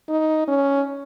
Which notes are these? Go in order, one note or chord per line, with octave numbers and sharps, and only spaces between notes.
D#4
C#4